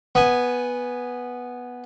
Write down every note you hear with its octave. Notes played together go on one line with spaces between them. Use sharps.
B3 G#5